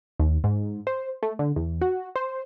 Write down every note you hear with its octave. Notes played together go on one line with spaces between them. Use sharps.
D#2
G#2
C5
A3
D3
E2
F#4
C5